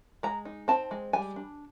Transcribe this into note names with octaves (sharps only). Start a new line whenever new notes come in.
G#3 A#5
D#4
C4 A5
G#3
G3 G#5
D4